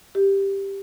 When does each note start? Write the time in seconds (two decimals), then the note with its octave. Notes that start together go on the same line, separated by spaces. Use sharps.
0.15 G4